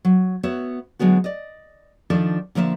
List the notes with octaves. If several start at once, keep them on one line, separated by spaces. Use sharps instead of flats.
F#3
B3 F#4 C#5 E5
D3 F#3 G#3 B3 F#4
D5 D#5
D#3 F3 D4 A4 D5
D3 F3 A#3 D#5 E5